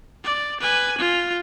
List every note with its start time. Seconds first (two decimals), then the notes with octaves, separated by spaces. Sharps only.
0.24 D5
0.61 B4 G#5
0.98 F4